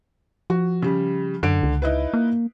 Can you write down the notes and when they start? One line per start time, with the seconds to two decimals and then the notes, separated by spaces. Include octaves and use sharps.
0.50 F3 F#4
0.82 C#3 G3
1.43 F#2 D3 D7
1.63 C#2
1.82 D#4 E4 B4
2.14 A#3